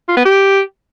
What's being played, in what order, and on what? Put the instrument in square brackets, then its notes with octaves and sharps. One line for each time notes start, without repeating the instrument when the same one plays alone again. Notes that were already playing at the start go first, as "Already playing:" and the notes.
[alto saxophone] F4
B3
G4